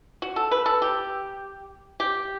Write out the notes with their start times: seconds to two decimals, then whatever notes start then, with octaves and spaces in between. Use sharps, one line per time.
0.22 F#4
0.36 A4
0.51 B4
0.66 A4
0.82 G4
2.00 G4